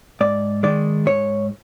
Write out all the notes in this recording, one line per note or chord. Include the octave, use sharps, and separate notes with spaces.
G#2 D5
D#3 G#3 D5
G#2 C#5